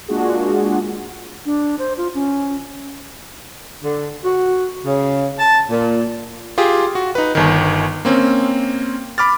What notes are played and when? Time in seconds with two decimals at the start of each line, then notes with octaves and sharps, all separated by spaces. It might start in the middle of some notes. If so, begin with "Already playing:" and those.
0.08 G#3 A#3 D4 F4 F#4 G#4
1.46 D4
1.79 C5
1.98 F4
2.15 C#4
3.83 D3
4.24 F#4
4.85 C#3
5.39 A5
5.70 A#2
6.58 F4 G4 G#4
6.95 F#4
7.15 D#4 B4
7.35 G1 D#3
8.05 A#3 C4 C#4
9.18 B5 D6 F6 A6